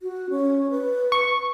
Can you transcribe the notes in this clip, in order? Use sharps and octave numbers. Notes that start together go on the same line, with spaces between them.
F#4
C#4
B4
C#6